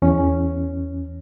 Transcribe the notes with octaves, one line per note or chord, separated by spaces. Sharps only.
E2 C#4